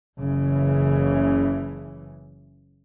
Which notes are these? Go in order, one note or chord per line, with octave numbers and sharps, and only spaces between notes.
F#1 C#3 E3